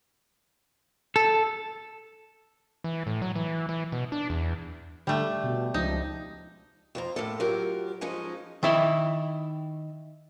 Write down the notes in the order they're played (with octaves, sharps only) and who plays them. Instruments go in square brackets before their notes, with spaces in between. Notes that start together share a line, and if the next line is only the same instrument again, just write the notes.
[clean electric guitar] A4
[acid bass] E3
A2
F#3
E3
E3
B2
D4
E2
[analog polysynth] D3 [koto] G3 A3
[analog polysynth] B2
[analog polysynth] C#2 F3 [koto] D#4
[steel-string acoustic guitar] F2 C5 A#5
A2 A#3 A4
F#3 F4 G4 A#4
G#2 F3 G#3 C#4 D#4 G#5
[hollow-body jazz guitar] D#3 E4 E5